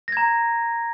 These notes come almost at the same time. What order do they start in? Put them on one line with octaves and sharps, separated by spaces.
A#6 G#6 A#5